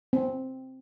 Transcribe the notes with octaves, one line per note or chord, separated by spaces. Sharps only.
C4